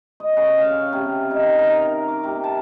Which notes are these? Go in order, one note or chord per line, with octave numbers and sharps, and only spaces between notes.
D#5
C#3
F5
C3
D#4
A#4
D6
C3
A5